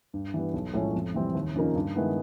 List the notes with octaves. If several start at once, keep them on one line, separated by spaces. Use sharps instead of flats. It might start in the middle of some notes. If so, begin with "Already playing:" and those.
G2
E3 G3 B3
B1
A2 F3 G#3 C#4
F2
C3 E3 G3 C4
D#2
C#3 F3 A#3 D#4
G2
D#3 G#3 B3 E4